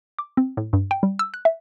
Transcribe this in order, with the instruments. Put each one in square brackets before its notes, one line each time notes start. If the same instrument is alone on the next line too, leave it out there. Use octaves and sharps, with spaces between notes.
[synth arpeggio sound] D6
C4
A2
G2
G5
G3
E6
F#6
E5